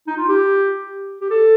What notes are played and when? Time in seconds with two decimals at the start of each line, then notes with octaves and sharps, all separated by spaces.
0.07 D#4
0.17 F4
0.28 G4
1.21 G4
1.30 A4